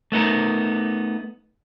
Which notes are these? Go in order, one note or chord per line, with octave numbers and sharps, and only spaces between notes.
A3 B3 D#4 A#4